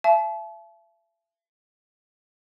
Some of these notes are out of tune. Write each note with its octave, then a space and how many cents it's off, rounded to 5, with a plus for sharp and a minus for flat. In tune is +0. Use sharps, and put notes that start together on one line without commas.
E5 +40 A5 -40